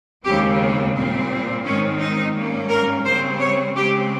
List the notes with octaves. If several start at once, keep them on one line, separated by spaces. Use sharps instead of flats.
D#2 C#3 G#3 C4 G4
A#2 G3 C4
G#2 D#3 G#3 C4 C#4
D#4
G#2 G3 A#3 C#4
A#4
C#3 G3 C4 C5
C#5
C#3 G#3 C4 G4